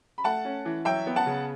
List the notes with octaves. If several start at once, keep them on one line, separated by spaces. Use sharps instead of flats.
B5
A3 F#5 A5
C#4
E3
F#3 E5 G5
B3
F#5 A5
C#3